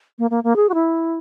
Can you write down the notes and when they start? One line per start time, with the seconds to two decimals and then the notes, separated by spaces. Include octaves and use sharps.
0.19 A#3
0.31 A#3
0.44 A#3
0.56 G#4
0.69 F#4
0.74 E4